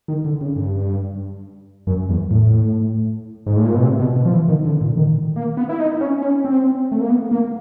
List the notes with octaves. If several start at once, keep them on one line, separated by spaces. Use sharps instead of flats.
D#3
D3
C#3
G2
F#2
E2
A2
G#2
A2
A#2
B2
C3
B2
B2
F3
E3
D#3
D3
A#2
D#3
A#3
B3
E4
D#4
C#4
C#4
C4
A3
A#3
B3
A#3